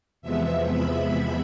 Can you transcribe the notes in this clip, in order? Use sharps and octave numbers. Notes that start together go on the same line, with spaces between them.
E2 C3 F3 G#3 B3 E5
B5